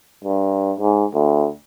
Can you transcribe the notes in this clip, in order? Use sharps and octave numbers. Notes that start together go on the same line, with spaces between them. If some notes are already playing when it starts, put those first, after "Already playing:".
G2
G#2
D2